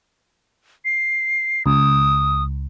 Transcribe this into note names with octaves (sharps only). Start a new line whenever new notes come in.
C7
C#2 D#6